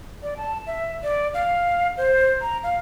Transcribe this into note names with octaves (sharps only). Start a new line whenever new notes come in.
D5
A5
E5
D5
F5
C5
A#5
F5